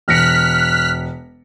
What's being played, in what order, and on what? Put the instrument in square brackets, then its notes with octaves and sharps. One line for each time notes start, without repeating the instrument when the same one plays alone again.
[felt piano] E1 A#6 C#7 [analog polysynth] F6 F#6 B6